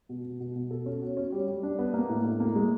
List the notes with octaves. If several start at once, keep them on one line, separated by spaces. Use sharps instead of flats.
B2
B2
B2
B2
A4
C#4
F#4
C#4
G3
G3
D4
B3
A#3
A2
A2
A#3
G#3